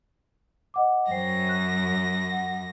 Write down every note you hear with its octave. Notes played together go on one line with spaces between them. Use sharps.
D#5 F#5 D6
F#2 C5 G5 A#6 C7
F#6
F#5